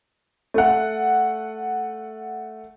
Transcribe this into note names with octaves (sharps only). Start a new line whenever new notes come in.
A3 F#5